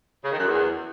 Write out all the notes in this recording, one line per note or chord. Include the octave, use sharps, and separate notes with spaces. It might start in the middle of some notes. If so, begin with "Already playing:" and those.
C#3
D#3
F#2
E2